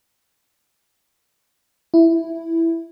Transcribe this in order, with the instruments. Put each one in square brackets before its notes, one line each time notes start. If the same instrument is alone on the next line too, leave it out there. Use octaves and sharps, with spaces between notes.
[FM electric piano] E4